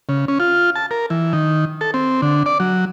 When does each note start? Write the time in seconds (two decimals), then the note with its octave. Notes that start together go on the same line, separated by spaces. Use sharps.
0.09 C#3
0.28 C#4
0.40 F4
0.76 A5
0.91 A#4
1.10 E3
1.33 D#3
1.81 A4
1.94 C4
2.22 D3
2.46 D5
2.60 F#3